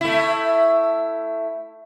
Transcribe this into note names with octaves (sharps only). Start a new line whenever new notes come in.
A3 E4